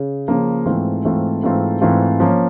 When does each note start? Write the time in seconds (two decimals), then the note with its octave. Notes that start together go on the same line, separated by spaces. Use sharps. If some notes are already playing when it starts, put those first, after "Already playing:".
Already playing: C#3
0.28 C#3 F3 A#3
0.66 G#2 E3 A3 C4 F4
1.05 G#2 E3 A3 C4 F4
1.43 G#2 E3 A3 C4 F4
1.81 G#2 E3 A3 C4 F4
2.20 F3 A#3 C#4